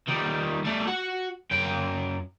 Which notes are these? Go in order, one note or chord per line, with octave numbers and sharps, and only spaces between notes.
D#3 G3
G3 A3
F#4 F#5
F#2 G5